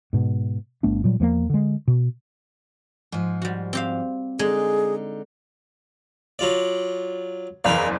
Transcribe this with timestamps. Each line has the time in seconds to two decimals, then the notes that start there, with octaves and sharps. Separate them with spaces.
0.13 G#2 B2
0.83 G1 A3 B3 D4
1.04 A#2 F#3 G3
1.20 E2 F3 A3 A#3
1.50 D3 G#3
1.88 B2
3.12 G#2 F3
3.42 G3 F#4
3.73 C4 G4 F5
4.39 D3 G#3 D#4 G#4
6.39 F#3 F4 D5
7.64 F#1 E2 A#4 B4 D5 F5